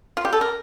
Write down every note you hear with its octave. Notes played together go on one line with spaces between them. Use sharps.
F4
G4
A4
A#4